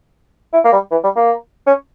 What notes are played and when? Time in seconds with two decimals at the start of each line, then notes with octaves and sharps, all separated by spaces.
0.53 E4
0.64 A#3
0.73 G3
0.91 E3
1.04 G3
1.16 A#3
1.67 C#4